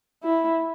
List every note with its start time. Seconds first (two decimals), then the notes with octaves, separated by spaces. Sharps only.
0.23 E4